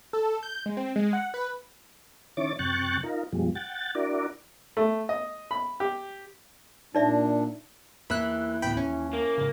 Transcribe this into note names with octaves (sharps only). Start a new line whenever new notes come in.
A4
G6
G#3
C4
G#3
F#5
B4
D#3 C#4 E4 C#5 D6 A6
F#2 C3 G5 C#6 F#6 A6
D#4 F4 A#4
F#2 B2 F3 G3 G#3
F#5 G5 A6
D4 E4 F#4 A#4 D5
A3
D#5
B5
G4
A#2 D4 D#4 D5 E5
E2 E3 A#3 B5 E6 F#6
D2 A2 B3 G5 B5
D#2 C#4
A#3
G#2 C#3